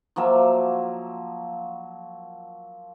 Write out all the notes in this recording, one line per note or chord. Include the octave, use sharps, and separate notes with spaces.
F3 F#3 A#3 E5